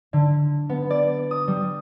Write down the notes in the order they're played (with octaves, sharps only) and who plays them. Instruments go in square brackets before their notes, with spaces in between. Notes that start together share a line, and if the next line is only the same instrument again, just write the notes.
[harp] D3
B3
D5
D#6
G3